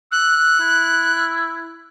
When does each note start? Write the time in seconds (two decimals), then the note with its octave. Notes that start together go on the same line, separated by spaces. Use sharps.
0.12 E6 F#6
0.60 E4